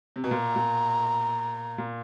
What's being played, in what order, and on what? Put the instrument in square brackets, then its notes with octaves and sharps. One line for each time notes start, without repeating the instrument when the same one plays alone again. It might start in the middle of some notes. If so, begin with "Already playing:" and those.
[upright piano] C3
B2
[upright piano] A#2 [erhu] A#5
[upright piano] A#2
A#2